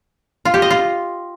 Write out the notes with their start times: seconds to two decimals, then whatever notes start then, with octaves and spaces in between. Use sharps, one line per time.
0.45 F4
0.54 G4
0.62 D#5
0.70 F4